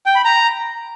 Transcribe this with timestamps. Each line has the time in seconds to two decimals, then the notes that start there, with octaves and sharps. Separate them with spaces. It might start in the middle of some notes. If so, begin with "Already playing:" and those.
0.06 G5
0.15 B5
0.25 A#5